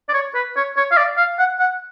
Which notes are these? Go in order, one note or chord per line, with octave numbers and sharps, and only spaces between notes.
D5
C#5
B4
C#5
C#5
F5
D5
F5
F#5
F#5